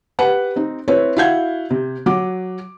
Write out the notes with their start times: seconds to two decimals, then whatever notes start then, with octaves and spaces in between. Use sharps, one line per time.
0.19 G4 B4 F#5 B5
0.56 C4 D#4
0.88 C4 E4 B4 C#5
1.16 E4 F#4 F5 F#5 G6 G#6
1.70 C3
2.06 F#3 D6